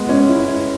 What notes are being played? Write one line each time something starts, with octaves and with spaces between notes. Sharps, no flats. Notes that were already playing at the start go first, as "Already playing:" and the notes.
Already playing: G#3 B3
C#4
E4